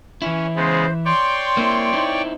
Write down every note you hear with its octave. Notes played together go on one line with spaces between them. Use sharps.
E3 C#4 E4
C#3 G#3 B3 C5
C#5 D5 G5 C6
A#3 C4 E4
C4 D#4 E4